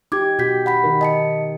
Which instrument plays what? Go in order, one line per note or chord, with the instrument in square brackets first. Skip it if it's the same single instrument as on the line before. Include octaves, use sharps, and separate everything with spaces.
[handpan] D#4 G4 [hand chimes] D6 G#6
[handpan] B2 G4 [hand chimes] F#4 G6 B6
[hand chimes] F#5 B5 B6
[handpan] D#3 D#4 A#4
[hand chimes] D#5 A5 C#7